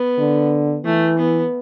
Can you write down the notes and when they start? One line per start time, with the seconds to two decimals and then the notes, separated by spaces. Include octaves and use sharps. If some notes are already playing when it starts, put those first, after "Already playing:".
Already playing: B3
0.18 D3
0.85 E3 A3
1.18 B3